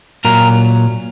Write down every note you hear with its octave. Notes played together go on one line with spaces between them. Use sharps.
A#2 F#3 A#4